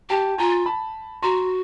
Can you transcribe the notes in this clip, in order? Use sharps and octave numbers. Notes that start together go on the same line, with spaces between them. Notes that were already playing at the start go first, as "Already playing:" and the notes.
G4 G5 A5
F4 G#5 A#5
A5 B5
F#4 A#5 C6